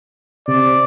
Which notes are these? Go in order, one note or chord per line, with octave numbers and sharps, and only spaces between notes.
C3 D5